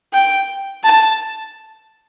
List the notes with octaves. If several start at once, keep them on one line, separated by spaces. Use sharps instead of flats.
G5
A5